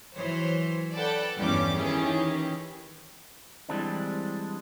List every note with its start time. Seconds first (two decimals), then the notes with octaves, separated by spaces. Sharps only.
0.15 E3 F#3 C5 C#5
0.96 A4 B4 D5 F#5 G5 A5
1.39 E2 G2 G3 C#4 G4 D6
1.79 D#3 E3 C#4 E4 G4 G#4
3.69 E3 G3 G#3 C4 D4